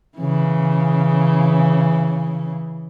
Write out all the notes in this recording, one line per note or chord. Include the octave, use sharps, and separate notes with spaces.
C#3 E3